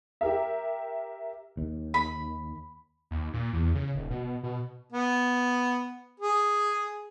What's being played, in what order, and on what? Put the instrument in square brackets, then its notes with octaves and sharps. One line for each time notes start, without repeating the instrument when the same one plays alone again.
[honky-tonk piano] G4 A#4 E5
[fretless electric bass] D#2
[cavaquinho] B5
[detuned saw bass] D#2
A#2
E2
C#3
D#1
B2
B2
[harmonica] B3
G#4